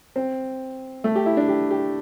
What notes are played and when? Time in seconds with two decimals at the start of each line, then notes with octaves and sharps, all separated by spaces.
0.16 C4
1.04 A3
1.15 G4
1.26 E4
1.37 D4
1.48 G4
1.70 G4